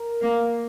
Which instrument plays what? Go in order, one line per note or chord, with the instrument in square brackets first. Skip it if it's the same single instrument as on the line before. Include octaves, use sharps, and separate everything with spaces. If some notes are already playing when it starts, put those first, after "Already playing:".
Already playing: [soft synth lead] A#4
[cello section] A#3